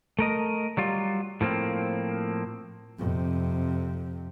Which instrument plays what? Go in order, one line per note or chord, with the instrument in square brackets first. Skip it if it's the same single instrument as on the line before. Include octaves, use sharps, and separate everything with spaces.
[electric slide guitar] A3 A#4 D#5
F#3 G3 F4
A2 F3 A#3 C4
[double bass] F2 C3